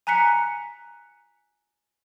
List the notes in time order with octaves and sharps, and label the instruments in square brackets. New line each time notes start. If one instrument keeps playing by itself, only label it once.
[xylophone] G#5 A#5 F#6 B6 C#7